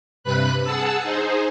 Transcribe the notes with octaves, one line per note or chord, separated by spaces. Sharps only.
G2 C3 B4 B5 F#6
G#4 F#5 A5 E6
D#4 G#4 C5